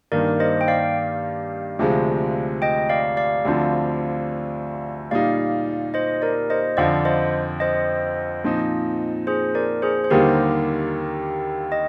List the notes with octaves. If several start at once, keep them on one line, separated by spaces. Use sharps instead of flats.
G2 D#3 A#3 A#4 D5
C5 D#5
G5
D5 F5
D2 C3 F3 G#3
D#5 G5
D5 F5
D5 F5
D2 D3 F3 C4
A#2 G3 A#3 D#4 D5 F5
C5 D#5
A#4 D5
C5 D#5
F2 D3 F3 D5 F5
C5 D#5
C5 D#5
A#2 F3 C4 D#4
G#4 C5
A#4 D5
G#4 C5
C5
D#2 D3 G3 A#3 D#4 G4 A#4
D#5